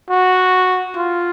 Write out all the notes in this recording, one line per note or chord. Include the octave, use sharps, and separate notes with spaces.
F#4
F4